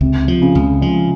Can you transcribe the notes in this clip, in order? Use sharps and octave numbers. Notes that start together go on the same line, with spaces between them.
C#2 C3
F3
C#3
C#2
F3 G#3